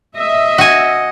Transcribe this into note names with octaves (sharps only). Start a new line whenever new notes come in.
D#5 E5
F#4 G#5